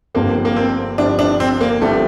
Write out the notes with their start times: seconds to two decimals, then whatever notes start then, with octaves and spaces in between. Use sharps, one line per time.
0.14 G1 G2 F3 A#3 C4
0.45 A#3
0.56 C4
0.98 G1 G2 F3 C4 D4
1.19 D4
1.40 C4
1.61 A#3
1.81 G1 G2 F3 A3 C4